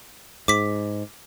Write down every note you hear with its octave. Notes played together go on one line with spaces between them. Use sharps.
G#2 D6 B6